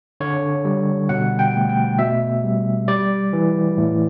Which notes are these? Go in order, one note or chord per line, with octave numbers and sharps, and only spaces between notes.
D3 C#5
G3
B2 F#5
G5
A3
G5
B2 E5
G3
G3 D5
E3
A2